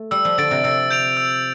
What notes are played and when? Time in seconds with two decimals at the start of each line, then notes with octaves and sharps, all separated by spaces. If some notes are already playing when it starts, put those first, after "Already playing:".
Already playing: A3
0.11 G3 E6
0.25 F3
0.38 D3 A6 D7
0.51 C3
0.64 C3 E6
0.91 G6 D7 F7
1.17 E6